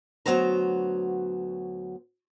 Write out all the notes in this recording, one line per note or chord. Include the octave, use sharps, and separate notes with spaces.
D2 D#3 F#3 B3 C5 A#5